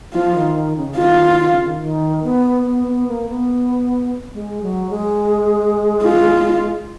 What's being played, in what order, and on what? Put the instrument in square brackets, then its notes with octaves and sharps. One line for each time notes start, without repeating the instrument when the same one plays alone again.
[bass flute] F3 [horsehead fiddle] F4
[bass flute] D#3
D#3
C#3
[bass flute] D#3 [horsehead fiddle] F4
[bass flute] D#3
C#3
D#3
D#3
B3
B3
B3
A#3
B3
G#3
F#3
G#3
[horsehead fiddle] F4